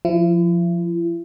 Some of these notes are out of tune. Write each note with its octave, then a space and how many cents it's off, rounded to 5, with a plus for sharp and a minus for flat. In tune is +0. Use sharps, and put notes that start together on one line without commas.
F3 +0 E4 +45